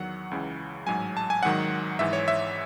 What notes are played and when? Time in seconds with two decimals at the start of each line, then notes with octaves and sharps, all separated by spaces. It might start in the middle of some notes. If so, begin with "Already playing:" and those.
Already playing: E2 D#3 F#3 F#5
0.31 C#2 C#3 E3
0.87 A1 G#2 F#3 G#5
1.17 A5
1.30 G#5
1.43 G#1 G#2 D#3 F#3 F#5
1.99 G#1 G#2 E3 E5
2.13 C#5
2.28 E5